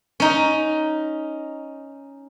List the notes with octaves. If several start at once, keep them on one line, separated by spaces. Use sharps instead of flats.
C#4 D#4